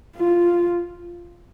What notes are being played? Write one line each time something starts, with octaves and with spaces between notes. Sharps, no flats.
F4